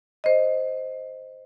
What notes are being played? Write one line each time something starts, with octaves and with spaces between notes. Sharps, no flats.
C5 D#5